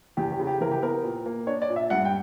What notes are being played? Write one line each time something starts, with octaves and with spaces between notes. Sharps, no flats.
E2 G4
G4
C#3
G4
E3 A#4
G4
B3 A#4
A#2
A#3
D4 C#5
D5
A#2
E5
G2 F#5
G5